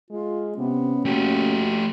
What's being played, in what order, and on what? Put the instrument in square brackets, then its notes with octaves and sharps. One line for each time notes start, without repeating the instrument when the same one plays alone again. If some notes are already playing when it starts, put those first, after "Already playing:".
[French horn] G#3 [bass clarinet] F4
[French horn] C3 [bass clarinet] B3 [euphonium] C#4
[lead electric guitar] A3 G4 [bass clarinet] A#3 [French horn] F#4